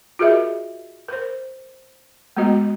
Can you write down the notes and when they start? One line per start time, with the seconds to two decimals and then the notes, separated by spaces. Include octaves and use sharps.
0.19 F4 F#4 G#4 A#4 D#5 E5
1.08 A#4 C5
2.37 G#3 A3 B3 F#4 D#5